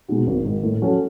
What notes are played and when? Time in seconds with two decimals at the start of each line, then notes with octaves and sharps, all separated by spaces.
0.08 B2 G#3 D#4 F#4
0.27 G#1
0.44 G#2 D#3
0.63 A2
0.82 F#3 C#4 F#4 A4